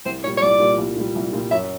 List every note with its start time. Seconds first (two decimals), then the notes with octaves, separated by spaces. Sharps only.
0.05 C2 C5
0.24 A#2 G3 C#5
0.37 C#5
0.42 C2 D5
0.60 A#2 G3
0.78 C2
0.96 A#2 G3
1.15 C2
1.33 A#2 G3
1.51 F#2 E5